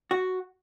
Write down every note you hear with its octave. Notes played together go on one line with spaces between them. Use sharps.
F#4